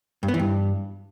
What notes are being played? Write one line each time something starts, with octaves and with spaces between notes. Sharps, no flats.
G2
B3
E3
G2